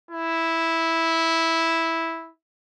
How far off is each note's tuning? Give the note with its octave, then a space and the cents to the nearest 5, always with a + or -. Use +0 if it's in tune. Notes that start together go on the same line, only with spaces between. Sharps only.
E4 -5